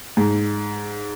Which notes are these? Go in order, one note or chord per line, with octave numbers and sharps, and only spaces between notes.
G#2